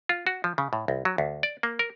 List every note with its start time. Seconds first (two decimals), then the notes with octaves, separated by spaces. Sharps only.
0.09 F4
0.27 F#4
0.44 F3
0.58 C#3
0.73 A2
0.88 C2
1.05 F#3
1.18 D2
1.43 D5
1.63 A#3
1.79 A#4